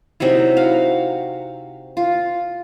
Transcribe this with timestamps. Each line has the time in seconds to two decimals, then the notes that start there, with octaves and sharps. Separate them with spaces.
0.20 C3 F#3 D#4 E4
0.56 F#4 F5
1.97 F4